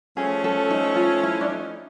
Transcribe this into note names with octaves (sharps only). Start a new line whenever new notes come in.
F3 A3 C#4 G#4
A4
D#4
F4
E4
D4
D#4